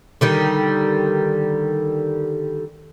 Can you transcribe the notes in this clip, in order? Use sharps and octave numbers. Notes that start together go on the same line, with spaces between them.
D3 D#3 G3